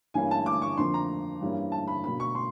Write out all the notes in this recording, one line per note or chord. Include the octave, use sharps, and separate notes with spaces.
G2 E3 G3 A#3 C#4 G#5
A5
D6
C#6
F2 D3 F3 A#3 D4 C6
A#5
G2 E3 G3 A#3 C#4
A5
B5
B2 F#3 A#3 D4 B5
C#6
C6